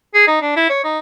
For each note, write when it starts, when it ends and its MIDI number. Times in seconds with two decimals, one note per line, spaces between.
0.14 0.27 68
0.28 0.39 63
0.42 0.53 62
0.57 0.68 64
0.70 0.82 73
0.84 0.99 63